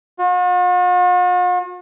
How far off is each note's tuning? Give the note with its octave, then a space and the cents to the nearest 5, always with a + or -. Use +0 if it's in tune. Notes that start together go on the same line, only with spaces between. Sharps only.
F#4 -45